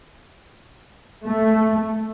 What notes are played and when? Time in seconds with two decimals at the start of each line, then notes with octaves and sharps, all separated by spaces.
1.24 A3